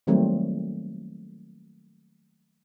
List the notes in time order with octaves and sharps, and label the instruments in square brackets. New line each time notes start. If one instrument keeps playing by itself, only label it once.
[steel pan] D#3 F#3 G3 A3 A#3 C4